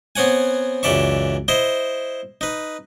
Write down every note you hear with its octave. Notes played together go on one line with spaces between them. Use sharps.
B3 C4 C#5 F#5 G#5
C#2 F#2 E3 D5 E5 C#6
E4 C5 D#5
D#4 B4